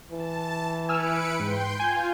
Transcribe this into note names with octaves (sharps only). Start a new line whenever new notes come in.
E3 A5
B4 G#5 E6 F6 C#7 D7
G#2 G5 C6 G6
F4 G#5 G6